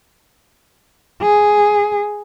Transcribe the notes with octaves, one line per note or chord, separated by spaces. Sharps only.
G#4